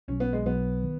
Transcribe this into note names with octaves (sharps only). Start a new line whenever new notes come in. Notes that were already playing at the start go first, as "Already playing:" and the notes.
B1 B2 F#3 C#4
B3
G#3
B1 B2 F#3 B3
D#3